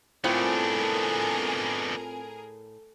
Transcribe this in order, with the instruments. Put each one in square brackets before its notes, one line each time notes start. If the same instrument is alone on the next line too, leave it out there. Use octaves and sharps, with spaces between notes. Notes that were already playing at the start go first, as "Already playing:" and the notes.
[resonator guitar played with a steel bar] A2 [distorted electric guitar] B3 D4 [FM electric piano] C4 F4 [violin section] G#4 A#4